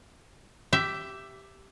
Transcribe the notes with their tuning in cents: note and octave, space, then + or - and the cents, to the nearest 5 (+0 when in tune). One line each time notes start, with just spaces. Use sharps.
G4 -10 E5 +10